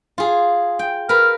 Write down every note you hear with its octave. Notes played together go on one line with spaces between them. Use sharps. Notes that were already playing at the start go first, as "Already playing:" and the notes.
F4 G#4
G5
A#4 B4 F6